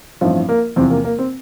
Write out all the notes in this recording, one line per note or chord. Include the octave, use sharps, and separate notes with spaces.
A1 G2 F3 C4 E4
A#3
E2 C3 F3 C4
A#3
A#3
C4